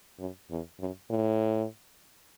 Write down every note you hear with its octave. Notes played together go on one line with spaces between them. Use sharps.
F#2
E2
F#2
A2